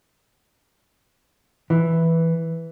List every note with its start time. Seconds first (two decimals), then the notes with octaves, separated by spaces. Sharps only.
1.70 E3